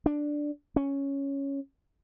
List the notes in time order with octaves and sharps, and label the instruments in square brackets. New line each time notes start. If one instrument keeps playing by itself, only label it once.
[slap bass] D4
C#4